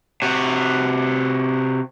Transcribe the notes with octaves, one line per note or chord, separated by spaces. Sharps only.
C3 F#4